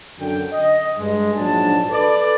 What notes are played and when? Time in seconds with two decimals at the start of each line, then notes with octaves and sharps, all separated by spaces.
0.20 F#2 D3 G5
0.52 D#5
0.98 G2 G#3
1.35 A#1 G#2 F#3 D4 A5
1.90 A4 B4 D5